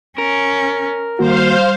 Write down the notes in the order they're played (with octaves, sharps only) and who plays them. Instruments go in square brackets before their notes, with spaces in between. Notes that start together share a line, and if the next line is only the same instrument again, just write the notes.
[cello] C#4 [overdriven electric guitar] A#4
[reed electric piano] D#3 A#3 F#4 [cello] G3 [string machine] C5 F5